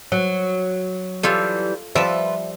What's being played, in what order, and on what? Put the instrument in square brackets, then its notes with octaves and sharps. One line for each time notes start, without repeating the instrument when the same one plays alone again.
[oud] F#3
[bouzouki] E3 G3 [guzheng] F4 A4
[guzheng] F3 G3 [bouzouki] F4 B4 [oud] E5